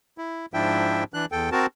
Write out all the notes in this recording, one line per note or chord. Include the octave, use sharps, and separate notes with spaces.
E4
G#2 F3 D4 E4 E5 G5
E3 D4 F#6
E2 A4 G5
C4 F#4 A#4 A5